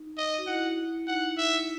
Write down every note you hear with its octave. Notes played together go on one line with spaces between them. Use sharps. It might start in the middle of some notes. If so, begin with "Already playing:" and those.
Already playing: D#4
D#5
F#4
E4 F#5
D#4 F#5
E5